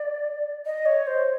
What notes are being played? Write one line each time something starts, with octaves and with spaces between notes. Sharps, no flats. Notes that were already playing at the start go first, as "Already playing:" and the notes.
Already playing: D5
D#5
C#5
C5